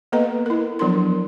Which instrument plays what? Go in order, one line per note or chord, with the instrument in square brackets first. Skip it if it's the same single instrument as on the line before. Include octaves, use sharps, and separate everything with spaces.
[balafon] A#3 B3 A4 B4 D#5 A#5
E4 A#4
F3 F#3 B3 D4 A#4 C6